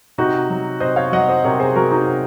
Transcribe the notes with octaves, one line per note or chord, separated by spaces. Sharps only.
C3 D#4 F#4
F#3
C3 C5 D#5
C#5 F5
F#3 D#5 F#5
C5 D#5
C3 A#4 C#5
G#4 C5
F#3 F#4 A#4
D#4 F#4
C3